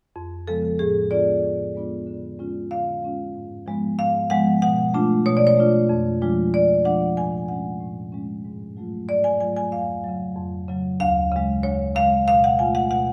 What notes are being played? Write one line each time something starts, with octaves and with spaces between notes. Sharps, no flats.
F2
C#3 F3 G#3 B3 A4
A2 G#4
G#3 B3 D4 F4 D5
A2
G#3 B3 D4 F4
D3
G#3 C#4 F4
D3 F5
G#3 C#4 F4
G#2
F3 G#3 B3
G#2 F5
F3 G#3 B3 F#5
B2 F#5
A3 D4 F4
B2 C#5
D5
C#5
A3 D4 F4
F2
F3 G#3 D4 F4
F2 D5
F3 G#3 D4 F4 F#5
A2 G#5
G#3 C#4 F#5
A2
G#3 C#4
G#2
F#3 A3 F4
G#2 D5
G#5
F#3 A3 F4 G#5
G#5
F2 F5
C#3 F#3
F2
C#3 F#3
D2 F5
C#3 G#3
D2 C#5
C#3 G#3 F5
B2 F5
F#5
A3 F4 G#5
F#5
B2 F#5